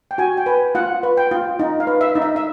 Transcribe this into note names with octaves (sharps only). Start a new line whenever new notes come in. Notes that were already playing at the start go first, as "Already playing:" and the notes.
G5
F#4 G#5
G5
B4 G#5
F4 F#5
B4
G5
F4
D#4
F5
B4
E5
D#4
E5
E5